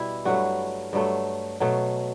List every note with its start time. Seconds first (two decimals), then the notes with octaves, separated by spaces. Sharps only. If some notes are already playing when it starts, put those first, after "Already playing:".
Already playing: B2 G3 E4
0.25 G2 F#3 A3 F#4
0.93 G2 F#3 A3
1.60 B2 F#3 A3